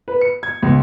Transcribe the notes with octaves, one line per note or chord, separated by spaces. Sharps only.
B4
C#7
G#6
C#2